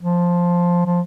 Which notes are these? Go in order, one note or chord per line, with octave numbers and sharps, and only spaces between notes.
F3
F3